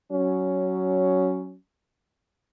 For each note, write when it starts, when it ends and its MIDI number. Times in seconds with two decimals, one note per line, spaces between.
0.11 1.55 54
0.11 1.55 61